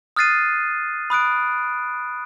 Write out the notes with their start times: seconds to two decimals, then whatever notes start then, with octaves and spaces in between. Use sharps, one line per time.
0.16 D#6 F6 F#6 A6 C7 D#7
1.10 B5 D#6 F#6 D7